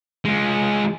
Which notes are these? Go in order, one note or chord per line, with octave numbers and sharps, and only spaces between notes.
G#3 F4